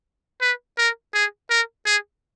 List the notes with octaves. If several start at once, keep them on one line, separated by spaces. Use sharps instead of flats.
B4
A#4
G#4
A#4
G#4